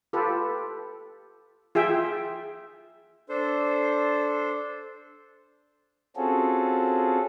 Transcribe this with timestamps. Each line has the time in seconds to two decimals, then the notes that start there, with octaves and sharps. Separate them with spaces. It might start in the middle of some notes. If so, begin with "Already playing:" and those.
0.13 F4 G4 A4 B4
1.75 F4 G#4 E5 G5
3.29 D4 A4 C5
6.16 C4 C#4 F4 F#4 G#4 A4